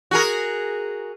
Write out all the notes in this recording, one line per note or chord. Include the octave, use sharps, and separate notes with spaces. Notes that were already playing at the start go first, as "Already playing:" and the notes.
F#4 G#4 A#4